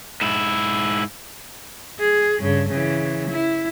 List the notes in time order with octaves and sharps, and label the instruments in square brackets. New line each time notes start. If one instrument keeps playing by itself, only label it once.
[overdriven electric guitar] G#2 E4
[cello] G#4
G2 C#3
C#3 E3
E4